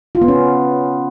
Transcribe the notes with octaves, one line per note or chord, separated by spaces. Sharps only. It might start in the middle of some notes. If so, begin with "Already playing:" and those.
F4
B3
C#4